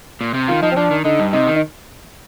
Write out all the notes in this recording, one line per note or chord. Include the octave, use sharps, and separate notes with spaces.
A#2
C3
D#3 F4
F3 D#4
C4
F3 D4
D#3
D3 D#4
G2
C3 D#4
D#3
D#4